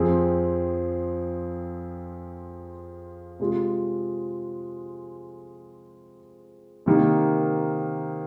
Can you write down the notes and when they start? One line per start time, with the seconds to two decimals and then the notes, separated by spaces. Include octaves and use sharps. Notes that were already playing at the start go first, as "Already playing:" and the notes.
Already playing: F2 F3 C4 G#4
3.40 C3 G#3 F4
6.86 C3 D#3 A#3 D#4